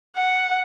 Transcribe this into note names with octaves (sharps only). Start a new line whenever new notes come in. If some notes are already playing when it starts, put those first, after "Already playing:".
F#5